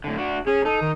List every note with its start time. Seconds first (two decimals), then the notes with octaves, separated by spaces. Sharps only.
0.04 A2 D3
0.18 D4 F#4
0.47 C#4 G#4
0.65 D#4 A4
0.81 D#3